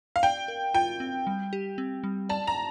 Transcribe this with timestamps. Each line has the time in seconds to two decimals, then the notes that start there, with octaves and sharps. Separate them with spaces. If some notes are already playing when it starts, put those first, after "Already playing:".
0.16 F5
0.23 D5 G5
0.48 A#4
0.74 F4 G5
1.00 C4
1.27 G3
1.53 G4
1.78 C4
2.04 G3
2.29 D5 A5
2.47 A#5